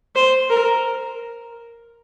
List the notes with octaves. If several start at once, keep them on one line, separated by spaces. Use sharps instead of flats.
C5
A#4